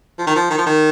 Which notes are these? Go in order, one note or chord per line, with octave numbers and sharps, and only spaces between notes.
F3
D#3
F3
D#3
F3
D#3